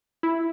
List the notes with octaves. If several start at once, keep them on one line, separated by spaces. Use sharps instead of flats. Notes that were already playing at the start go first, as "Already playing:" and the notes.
E4